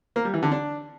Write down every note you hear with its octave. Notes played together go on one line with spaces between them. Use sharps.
A#3
G3
E3
D3
D4